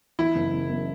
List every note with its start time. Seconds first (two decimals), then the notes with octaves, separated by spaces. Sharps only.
0.19 E3 E4
0.36 F#1
0.54 C#3
0.69 F#2